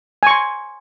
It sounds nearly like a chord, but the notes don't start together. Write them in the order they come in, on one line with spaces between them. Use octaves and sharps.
G#5 C#6 C6